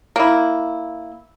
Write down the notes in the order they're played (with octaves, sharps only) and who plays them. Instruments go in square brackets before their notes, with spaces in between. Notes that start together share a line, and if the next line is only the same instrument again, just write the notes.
[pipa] A#3 E4